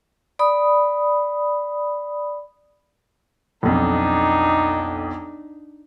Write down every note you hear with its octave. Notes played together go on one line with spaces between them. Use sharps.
D5 B5 D#6
B1 F2 D4 D#4